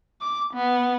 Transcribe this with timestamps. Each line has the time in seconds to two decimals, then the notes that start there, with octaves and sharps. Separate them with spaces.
0.21 D6
0.54 B3